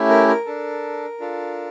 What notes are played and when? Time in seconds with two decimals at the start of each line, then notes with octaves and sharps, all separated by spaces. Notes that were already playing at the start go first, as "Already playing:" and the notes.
Already playing: A3 C#4 E4 G4
0.09 A#4
0.28 A#4
0.46 D4 A4
1.20 D4 F4 A4